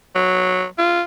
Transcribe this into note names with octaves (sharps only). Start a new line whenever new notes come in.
F#3
F4